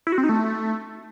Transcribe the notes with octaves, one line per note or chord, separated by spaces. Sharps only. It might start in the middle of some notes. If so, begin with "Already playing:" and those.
E4
F#4
C4
D#4
A3